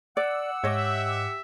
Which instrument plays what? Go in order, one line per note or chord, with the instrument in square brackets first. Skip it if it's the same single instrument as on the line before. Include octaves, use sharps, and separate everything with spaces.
[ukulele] D5 [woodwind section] F#5 E6 [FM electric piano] D6
[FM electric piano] G#2 D6 [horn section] G4 E5 [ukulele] C#5 D#5